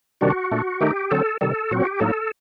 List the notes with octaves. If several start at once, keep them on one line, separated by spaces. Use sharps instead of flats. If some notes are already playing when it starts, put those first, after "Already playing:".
C3 D#3 G3 D4 F#4
A#2 A3 D4
D#3 A3 D#4 G4
D3 F#3 C4 A4
C3 D#3 G3 A4
A#2 F#3 C4 F#4
G4
A2 F#3 A#3 D#4 A4